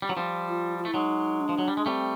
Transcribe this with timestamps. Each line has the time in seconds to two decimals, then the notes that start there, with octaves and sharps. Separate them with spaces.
0.02 G3
0.09 F#3
0.17 F3 G3
0.49 F4
0.79 F4
0.85 A3 E4
0.94 F#3 G#3 D#4
1.40 D4
1.49 F3
1.58 F#3
1.68 G3
1.77 G#3
1.86 G3 A3 C4